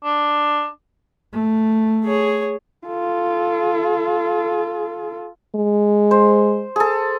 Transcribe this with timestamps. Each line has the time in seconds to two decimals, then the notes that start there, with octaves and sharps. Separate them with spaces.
0.04 D4
1.33 A3
2.04 G#4 C#5
2.88 F4 A4
5.55 G#3
6.11 C5
6.76 G#4 A4